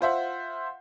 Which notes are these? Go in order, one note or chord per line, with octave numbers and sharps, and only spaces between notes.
F4 C5 E5 F#5